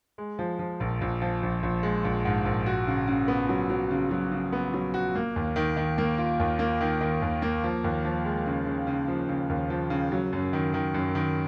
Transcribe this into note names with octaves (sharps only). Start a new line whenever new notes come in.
G#3
F3
F3
A#1
A#1
F3
A#1
A#1
G#3
A#1
G#2
A#1
F#4
C#3
C#3
B3
F#3
F#3
C#3
F#3
C#3
B3
F#3
F#4
A#3
D#2
D#3
D#3
A#3
F4
D#2
A#3
D#3
D#3
D#2
A#3
F3
D#2
F3
G#3
C#3
C#3
C#3
F3
C#3
D#2
F3
C#3
F#3
F#2
D#3
D#3
F#2
D#3